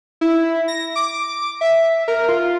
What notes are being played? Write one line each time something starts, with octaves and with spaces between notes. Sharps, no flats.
E4
A#6
D6
E5
A#4
F4